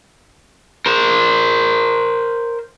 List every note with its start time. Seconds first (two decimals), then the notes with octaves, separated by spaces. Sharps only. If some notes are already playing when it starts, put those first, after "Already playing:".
0.86 A#4 C5